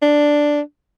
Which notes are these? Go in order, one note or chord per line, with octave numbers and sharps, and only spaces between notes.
D4